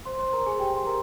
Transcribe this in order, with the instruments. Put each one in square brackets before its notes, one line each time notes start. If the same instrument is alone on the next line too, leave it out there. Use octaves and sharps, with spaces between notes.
[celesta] C5 C6
C5 C6
A#4 A#5
G#4 G#5
G4 G5
C6
A#4 A#5